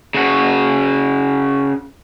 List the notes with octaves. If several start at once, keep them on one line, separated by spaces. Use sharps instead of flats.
C#3 F#4